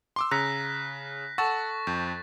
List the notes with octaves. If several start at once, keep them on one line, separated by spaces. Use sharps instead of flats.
C6 D6 E6
C#3 A#5 E6 F#6 A#6 B6 C#7
A4 F#5 A5 C#6 E6 A6
F2 G6